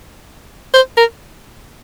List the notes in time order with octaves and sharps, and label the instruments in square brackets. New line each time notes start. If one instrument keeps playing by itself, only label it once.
[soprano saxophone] C5
A#4